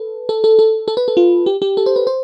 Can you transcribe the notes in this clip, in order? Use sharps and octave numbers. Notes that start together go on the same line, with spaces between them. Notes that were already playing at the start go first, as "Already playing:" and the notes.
Already playing: A4 B4
A4
A4
A4
A4
B4
A4
F4
G4
G4
A4
C5
B4
C5